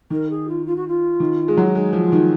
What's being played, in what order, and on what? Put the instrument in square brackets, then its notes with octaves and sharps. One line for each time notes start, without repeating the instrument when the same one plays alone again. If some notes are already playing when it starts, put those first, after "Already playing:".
[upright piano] D#3 [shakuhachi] A#4
[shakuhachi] G#4
F4
F4
F#4
F4
[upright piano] D#3
G#3
F#3
[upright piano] G#3 [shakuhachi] D#4
[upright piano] F3
[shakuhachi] F4
[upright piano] D#3